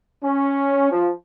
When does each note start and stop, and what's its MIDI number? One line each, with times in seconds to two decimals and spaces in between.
0.23 0.87 61
0.92 1.11 53